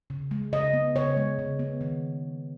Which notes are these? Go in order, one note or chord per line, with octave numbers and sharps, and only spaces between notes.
C#3
G#3
C#3 D#5
B3
C#3 C#5
G#3
C#3
B3
D#3